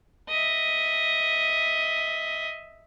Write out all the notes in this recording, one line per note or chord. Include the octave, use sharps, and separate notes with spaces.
D#5 E5